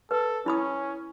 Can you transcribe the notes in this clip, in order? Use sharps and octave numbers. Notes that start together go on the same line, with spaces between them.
A4 B4
C#4 E4 B5 D#6